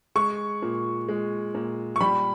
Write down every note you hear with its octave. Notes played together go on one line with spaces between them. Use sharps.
G#3 C#6
A#2
G#3
A#2
C#6
G3 B5